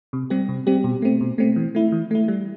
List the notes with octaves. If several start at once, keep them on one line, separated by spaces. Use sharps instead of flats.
C3
G3 C4 G4
C3
G3 C4 G4
B2
A3 C4
B2
A3 C4
E3
A3 E4
E3
A3 E4
G3